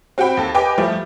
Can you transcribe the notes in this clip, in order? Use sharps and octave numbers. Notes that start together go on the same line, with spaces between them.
C4 F#4 F#5 G5 B5
D#2 A4
G4 B4 D#5 G5 G#5 D6
F3 G3 A3